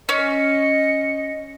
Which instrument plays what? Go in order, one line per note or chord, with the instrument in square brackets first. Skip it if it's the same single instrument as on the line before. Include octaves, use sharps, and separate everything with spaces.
[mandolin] C#4 [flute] D#5 [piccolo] C#7